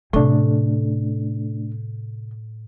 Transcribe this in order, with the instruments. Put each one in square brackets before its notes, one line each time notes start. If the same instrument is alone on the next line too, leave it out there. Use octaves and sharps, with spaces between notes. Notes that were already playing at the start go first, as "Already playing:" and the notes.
[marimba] A2 [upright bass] C3 C#4 [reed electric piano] A3 D4